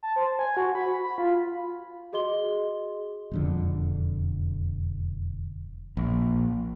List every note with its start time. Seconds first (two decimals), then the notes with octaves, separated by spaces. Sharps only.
0.03 A5
0.16 C5
0.39 G#5
0.57 F#4
0.75 B5
1.03 B5
1.18 F4
2.13 F#4 G#4 D#5 C6 G7
3.31 E1 F2 D3
5.97 A#1